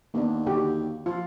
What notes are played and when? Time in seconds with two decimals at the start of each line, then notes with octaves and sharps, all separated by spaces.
0.14 D#2 A#3 B3 D4
0.46 D3 F#4 G4
1.06 F3 F4